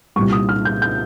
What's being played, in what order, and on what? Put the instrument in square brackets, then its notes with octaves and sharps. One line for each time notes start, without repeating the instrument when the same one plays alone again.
[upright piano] C2 A#2 G3 C#6
D#6
F6
G6
G6